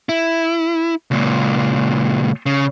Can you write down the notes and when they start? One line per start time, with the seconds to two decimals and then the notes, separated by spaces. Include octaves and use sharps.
0.09 E4
1.11 C#2 A#2
2.46 C#3